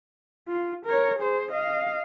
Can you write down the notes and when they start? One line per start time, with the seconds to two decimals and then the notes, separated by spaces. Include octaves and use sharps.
0.47 F4
0.86 A#4 C#5
1.19 G#4 C5
1.52 D#5 F5